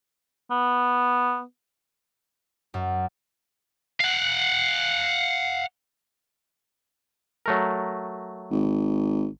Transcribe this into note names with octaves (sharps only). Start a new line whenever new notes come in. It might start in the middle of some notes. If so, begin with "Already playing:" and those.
B3
F#2
F5 F#5
F#3 A3 A#4
G#1